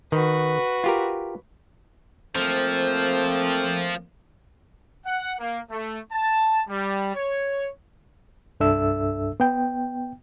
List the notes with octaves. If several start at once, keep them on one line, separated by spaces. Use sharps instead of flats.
D#3 F#4 B4
F4 G4 A#4
F3 A3 A#3 C4
F#5
A#3
A3
A5
G3
C#5
C2 G2 D4 A4 E5 E6
B3 G5